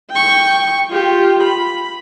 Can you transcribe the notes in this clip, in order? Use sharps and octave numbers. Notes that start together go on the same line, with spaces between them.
G5 C#6
F4 G4
B5